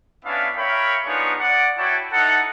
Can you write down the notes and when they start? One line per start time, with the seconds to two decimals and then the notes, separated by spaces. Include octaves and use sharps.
0.25 B3 C#4 D4 E4 E5 F5
0.56 A#4 C#5 E5 F5 G5 B5
1.05 B3 D4 D#4 F4 G#4 C#5
1.39 D5 F#5
1.78 E4 F#4 C#5 G5 A5
2.12 D#4 E4 A4 F#5